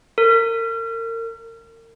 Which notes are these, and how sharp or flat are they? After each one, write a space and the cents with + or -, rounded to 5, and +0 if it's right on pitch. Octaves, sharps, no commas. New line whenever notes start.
A#4 -35